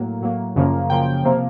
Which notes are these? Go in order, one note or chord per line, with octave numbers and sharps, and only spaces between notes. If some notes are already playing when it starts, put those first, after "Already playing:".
Already playing: A2 F#3 A#3
A2 F#3 A#3
F#2 C#3 F3 A#3
F#2 C#3 F3 A#3 G5
C3 F3 A#3